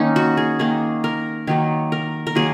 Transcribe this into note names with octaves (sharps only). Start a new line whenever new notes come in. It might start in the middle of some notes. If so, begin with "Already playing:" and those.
Already playing: D#3 A#3 C#4 D#4
F#4
G#4
D#3 A#3 G#4
A#4
D#3 F#3 A#3 C#5
A#4
A#4
D#3 F#3 A#3 G#4